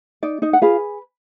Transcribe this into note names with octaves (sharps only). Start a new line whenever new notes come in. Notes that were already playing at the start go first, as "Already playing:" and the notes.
D#4 D5
D#4 D#5
F#5
F4 G#4 B4 F5